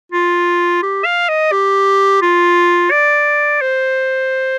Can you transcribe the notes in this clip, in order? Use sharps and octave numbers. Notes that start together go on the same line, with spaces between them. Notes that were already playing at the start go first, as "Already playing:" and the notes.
F4
G4
F5
D#5
G4
F4
D5
C5